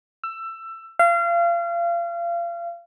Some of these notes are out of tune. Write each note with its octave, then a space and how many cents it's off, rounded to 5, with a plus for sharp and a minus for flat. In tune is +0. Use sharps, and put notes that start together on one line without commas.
E6 +20
F5 -30